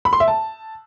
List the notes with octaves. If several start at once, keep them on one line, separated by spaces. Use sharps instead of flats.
B5
C6
E5
A5